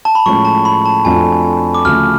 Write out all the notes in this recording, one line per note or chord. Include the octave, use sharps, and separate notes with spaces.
A5
B5
A2 F3 G#3 C#4 C#6
A5
B5
A5
F2 F3 A3 D4 F#4 G#5
D6
D2 C#3 F3 F6